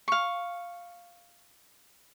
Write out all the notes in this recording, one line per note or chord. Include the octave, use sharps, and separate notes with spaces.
F5 C#6